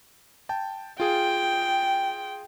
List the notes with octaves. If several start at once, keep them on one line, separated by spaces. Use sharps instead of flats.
G5 A5
F4 G#4 G5